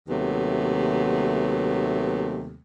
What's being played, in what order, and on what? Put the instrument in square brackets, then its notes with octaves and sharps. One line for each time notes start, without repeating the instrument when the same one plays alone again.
[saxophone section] D#2 C3 F#3 A3 B3